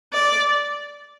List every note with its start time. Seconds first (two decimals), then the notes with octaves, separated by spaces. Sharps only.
0.13 D5